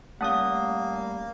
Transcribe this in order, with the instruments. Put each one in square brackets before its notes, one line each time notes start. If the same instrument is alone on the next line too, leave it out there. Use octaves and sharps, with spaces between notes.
[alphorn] G3 [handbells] A3 C#4 F5 [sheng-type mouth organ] A#3 [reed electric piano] F#5 A5 D#6